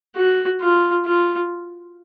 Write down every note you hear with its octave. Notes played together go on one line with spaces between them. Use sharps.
F#4
F4
F4